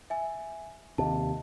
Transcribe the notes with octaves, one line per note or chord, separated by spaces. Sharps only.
E5 G#5
D#2 C3 A5